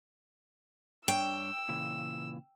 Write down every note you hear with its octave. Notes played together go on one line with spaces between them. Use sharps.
G2 D4 C#5 G5 E6
A#2 C#3 E3